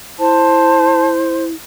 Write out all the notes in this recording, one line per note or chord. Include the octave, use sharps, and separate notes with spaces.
E4 C5 A5